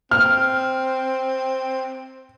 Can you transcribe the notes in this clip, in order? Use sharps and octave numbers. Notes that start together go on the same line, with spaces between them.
C4 F6